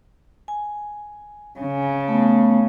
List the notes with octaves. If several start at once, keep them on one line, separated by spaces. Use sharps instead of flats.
G#5
C#3
A3 B3